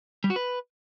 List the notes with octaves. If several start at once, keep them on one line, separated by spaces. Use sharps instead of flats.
G3
F#4
B4